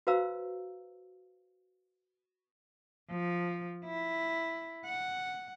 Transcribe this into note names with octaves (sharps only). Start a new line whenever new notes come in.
F#4 B4 C5 F5 A#5 E6
F3
E4
F#5